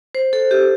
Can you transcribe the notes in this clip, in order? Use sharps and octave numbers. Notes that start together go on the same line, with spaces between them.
C5
A4
G4